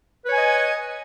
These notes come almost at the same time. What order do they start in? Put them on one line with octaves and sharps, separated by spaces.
B4 C#5 G#5 D#5